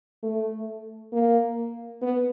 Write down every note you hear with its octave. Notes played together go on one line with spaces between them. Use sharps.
A3
A#3
B3